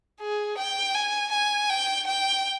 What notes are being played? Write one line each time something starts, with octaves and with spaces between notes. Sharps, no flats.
G#4
G5
G#5
G#5
G5
G5